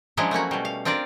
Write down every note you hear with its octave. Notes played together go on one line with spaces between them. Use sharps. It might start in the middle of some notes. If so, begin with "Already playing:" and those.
F3 F#3 G#3 C#4 D4 E4
A3 A#3 C#4 F#4
B2 G3
F5
C4 D4 F4 A#4 D5